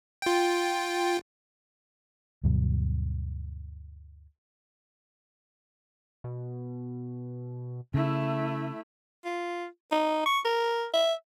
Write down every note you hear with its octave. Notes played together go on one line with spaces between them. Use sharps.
F4 G5
D2 G2 B2 F#3
B2
C#3 A3 E4
F4
D#4
C#6
A#4
E5